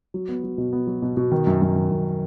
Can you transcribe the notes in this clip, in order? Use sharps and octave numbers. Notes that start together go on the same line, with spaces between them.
F#3
B3
F#3
B2
B3
F#3
B2
B2
D#3
F#2
F#2
D#3
F#2